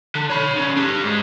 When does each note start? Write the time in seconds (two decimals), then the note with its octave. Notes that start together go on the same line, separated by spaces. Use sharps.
0.15 D3
0.30 C#5 B5
0.56 D3 C#4
0.77 D4 G4
1.04 G#2 G#3